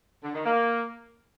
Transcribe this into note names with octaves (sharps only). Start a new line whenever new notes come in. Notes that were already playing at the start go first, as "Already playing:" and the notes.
D3
D#3
A#3